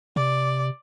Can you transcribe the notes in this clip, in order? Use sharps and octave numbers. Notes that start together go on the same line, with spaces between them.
C3 D5